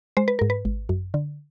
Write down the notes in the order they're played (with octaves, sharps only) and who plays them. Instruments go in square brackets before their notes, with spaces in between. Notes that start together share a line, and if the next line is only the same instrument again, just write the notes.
[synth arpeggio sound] G#3 C5
B4
G#2 A#4
B4
G#1
F#2
D3